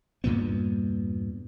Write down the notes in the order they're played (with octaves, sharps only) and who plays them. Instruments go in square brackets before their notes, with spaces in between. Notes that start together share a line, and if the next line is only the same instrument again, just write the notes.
[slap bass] E2 G2 A#2 B3